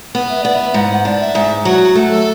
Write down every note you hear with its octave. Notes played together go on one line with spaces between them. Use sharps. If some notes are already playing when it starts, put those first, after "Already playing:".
B3
E5
B3 D5
E5
G#2 F#5
D4
E5
G#2
F#3 F#4
A3
A4